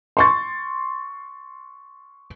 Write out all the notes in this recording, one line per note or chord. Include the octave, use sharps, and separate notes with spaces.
C6 C#6 A6